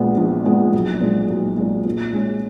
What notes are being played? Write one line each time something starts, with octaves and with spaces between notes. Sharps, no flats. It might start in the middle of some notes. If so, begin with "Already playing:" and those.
Already playing: A#1 A#2 G#3 B3
A#1
A#2 G#3 B3
B1
A#2 G#3
B1
A#2 G#3
A#2
G#3 C#4